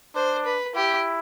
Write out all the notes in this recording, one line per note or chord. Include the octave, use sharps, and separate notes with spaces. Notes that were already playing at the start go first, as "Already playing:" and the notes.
D4 C5
B4
E4 G4